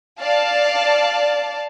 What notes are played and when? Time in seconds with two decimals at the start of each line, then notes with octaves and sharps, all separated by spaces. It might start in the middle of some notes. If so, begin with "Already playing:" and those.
0.19 D5 F5 A5